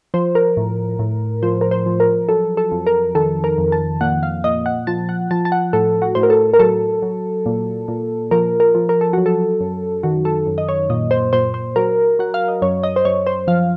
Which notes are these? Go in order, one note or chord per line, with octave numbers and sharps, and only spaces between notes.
F3 C5
A#4
A2
A2
F3 C5
A#4
C5
F3
A#4
F#3 A4
A4
F2
A#4
D#3 A4
A#4
F2
A5
A#2 F#5
F5
A#2 D#5
F#5
F3 A5
F#5
F3 A5
A5
F#5
A2 A4
F#4
A2 C5
A#4
A4
A#4
F#3 A4
F#3
A#2
A#2
F3 A#4
A#4
F3
A#4
A4
F#3 F#4
A4
F#2
D#3 F#4
A4
F#2
D#5
C#5
A#2 D#5
C5
A#2 C5
C5
F#3 A#4
F#3 F#5
F5
D#5
F#2 C#5
D#5
C5
F#2 C#5
C5
F3 F5